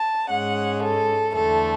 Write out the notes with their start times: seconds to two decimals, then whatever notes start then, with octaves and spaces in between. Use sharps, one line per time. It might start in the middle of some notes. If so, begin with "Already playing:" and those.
Already playing: A5
0.31 G#2 G#3 C#4 F#5
0.83 A4
1.35 E2 D3 A3 A4